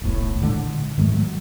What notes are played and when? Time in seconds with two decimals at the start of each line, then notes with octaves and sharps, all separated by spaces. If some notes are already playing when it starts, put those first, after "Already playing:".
0.02 D#1 B1 A2
0.41 A#2 D3 G#3
0.98 G#2 D#3 G#3 A3
1.14 F#3